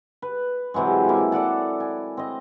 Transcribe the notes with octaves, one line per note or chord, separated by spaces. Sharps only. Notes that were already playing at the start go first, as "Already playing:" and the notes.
B4
C3 E3 F#3 G#3
A#3 E4
A4 D5 F#5 A5
G#5
C4 D#5